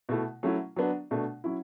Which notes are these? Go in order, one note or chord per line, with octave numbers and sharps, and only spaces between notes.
B2 A3 E4
F#3 A3 C#4 E4
F#3 B3 D4
B2 A3 D4
F#3 C#4 E4